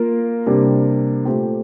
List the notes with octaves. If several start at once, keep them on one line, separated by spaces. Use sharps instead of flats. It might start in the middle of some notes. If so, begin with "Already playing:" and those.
Already playing: A#3 F4 A#4
C3 G3 A#3 D4
A#2 A3 C4 G4